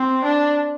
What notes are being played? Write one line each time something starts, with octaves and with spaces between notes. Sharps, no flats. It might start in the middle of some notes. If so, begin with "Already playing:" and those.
Already playing: C4
D4